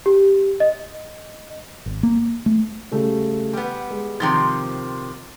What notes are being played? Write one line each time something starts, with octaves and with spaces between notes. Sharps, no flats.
G4
D#5
G#1
A#3
A3
C#3 G3 A3
G3 B3
G#3
C3 D#3 F3 A6